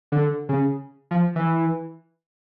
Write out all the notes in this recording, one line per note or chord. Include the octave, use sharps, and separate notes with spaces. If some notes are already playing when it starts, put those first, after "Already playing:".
D3
C#3
F3
E3